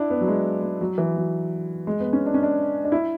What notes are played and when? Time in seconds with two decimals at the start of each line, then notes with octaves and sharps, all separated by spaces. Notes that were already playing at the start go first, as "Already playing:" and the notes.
Already playing: D4 E4
0.10 B3
0.21 F#3
0.28 G#3
0.63 G#3
0.81 F#3
0.98 E3
1.16 F#3
1.87 G#3
2.00 B3
2.13 C#4
2.26 D4
2.34 C#4
2.43 D4
2.84 D4
2.92 E4